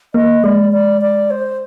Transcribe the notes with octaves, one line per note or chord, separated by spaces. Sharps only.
A#3 D#5
G#3 D5
D5
D5
C5